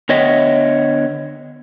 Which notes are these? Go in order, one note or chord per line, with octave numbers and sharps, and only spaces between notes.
D3 B3 C#5 D#5 E5 G5